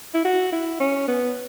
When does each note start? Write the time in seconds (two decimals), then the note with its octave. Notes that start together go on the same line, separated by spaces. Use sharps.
0.14 E4
0.25 F#4
0.53 E4
0.80 C#4
1.08 B3